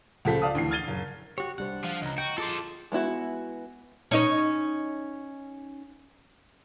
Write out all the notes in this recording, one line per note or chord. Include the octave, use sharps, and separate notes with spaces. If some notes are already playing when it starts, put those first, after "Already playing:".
C#2 C#3 F3 A4 B6
D5 F5 A5 D#6
D2 E3 C7
F6 G#6 A6 D#7 G7
F#1
F#4 G4 C#5
C2 G3 D4 C5 F#5
F3 F5
C#2 D#5 A#5
F#4 G5
F4 G#4 A4 C5 D6
G#3 B3 E4 F#4
C#4 D#4 C#5